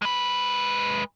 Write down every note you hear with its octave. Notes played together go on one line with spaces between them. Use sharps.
G#3 B4